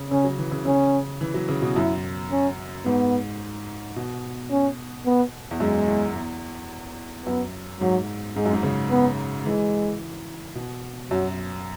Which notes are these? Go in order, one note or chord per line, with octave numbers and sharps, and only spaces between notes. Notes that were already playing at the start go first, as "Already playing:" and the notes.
Already playing: C#3
C#3 C#4
F#3
E3
C#3
C#3 C#4
E3
F#3
C#3
B2
F#2 E4
C#4
G#2 B3
B2
C#4
B3
E2
F#2 G#3
E2
E2
F#2 B3
G#2 F#3
G#2 G#3
F#2
G#2
C#3
B3
E3 G#3
B2
F#2 F#3